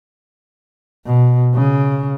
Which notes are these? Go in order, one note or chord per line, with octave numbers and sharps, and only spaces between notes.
B2
C#3